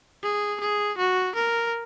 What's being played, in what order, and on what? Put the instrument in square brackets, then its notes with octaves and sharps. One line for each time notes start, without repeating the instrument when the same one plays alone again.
[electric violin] G#4
G#4
F#4
A#4